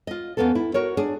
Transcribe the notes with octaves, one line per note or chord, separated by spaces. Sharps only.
F4 D#5
E2 A#3 B3 C#4 A4
E4
F#4 A#4 C#5
D4 G#4